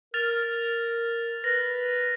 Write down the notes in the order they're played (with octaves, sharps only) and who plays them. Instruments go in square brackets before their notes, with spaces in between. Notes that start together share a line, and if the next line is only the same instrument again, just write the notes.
[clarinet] A#4 [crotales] F6 A6 F7
[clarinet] B4 [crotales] A#6